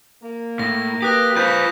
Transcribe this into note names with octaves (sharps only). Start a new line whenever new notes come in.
A#3
A2 A#6
G4 B4 D#6 F#6 A#6
F4 B4 C5 G6 B6